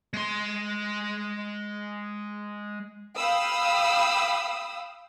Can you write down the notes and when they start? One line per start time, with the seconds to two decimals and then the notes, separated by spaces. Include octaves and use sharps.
0.13 G#3 C6
3.17 F5 G5 B5 D#6 E6